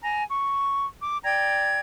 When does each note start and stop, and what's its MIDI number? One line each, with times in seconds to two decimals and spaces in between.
0.03 0.24 80
0.03 0.24 82
0.29 0.87 85
1.02 1.16 86
1.24 1.80 74
1.24 1.80 79
1.24 1.80 82
1.24 1.80 92